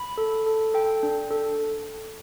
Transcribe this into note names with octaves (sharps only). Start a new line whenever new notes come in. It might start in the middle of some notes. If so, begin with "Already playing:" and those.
Already playing: B5
A4
A4
A4 G5
D4
A4